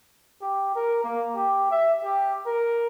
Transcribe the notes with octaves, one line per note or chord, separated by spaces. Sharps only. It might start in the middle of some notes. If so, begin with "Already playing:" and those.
G4
A#4
A#3
G4
E5
G4
A#4